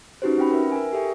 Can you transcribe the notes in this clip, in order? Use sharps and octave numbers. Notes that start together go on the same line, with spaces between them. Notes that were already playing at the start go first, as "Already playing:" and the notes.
C#4 D#4 F#4 G4 B4 C5
C4 C#4 G5 B5
A#4 B4 E5
A#4 G#5
G4 A4 E5 G5